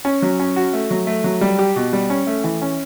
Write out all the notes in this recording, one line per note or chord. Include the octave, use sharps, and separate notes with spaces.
C#4
F#3
C#4
F#4
A3
F#3
A3
F#3
G3
G4
B2
G3
C#4
A3
E3
C#4